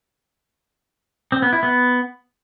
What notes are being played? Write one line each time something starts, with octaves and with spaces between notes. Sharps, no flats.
C4
B3
E4
B3